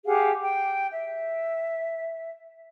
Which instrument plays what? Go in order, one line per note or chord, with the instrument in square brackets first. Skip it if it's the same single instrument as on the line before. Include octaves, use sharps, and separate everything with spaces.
[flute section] G4 G#4 F5 F#5
G5
E5